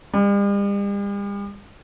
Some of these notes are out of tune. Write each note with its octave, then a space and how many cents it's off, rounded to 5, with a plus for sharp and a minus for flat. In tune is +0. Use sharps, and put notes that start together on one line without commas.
G3 +45